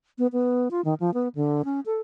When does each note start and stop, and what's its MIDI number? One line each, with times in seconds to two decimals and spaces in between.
0.18 0.27 59
0.33 0.68 59
0.71 0.81 65
0.85 0.94 51
1.00 1.13 53
1.14 1.28 59
1.35 1.62 50
1.65 1.80 61
1.86 2.01 69